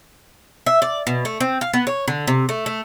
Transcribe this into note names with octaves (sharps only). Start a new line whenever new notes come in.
E5
D5
B2
A3
C4
F5
B3
C#5
D3
C3
A3
A3